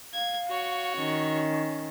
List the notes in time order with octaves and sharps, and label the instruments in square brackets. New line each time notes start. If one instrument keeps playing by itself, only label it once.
[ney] F5 [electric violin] G#6
[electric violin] F#4 C#5
[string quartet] D#3 [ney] C#4